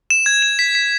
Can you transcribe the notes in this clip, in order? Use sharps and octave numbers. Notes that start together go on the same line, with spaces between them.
E7
G#6
E7
B6
B6